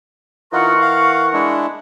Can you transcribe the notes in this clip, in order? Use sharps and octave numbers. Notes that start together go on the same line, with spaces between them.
E3 D#4 F4 A#4 F#5 C#6
F5
G#3 D4 E4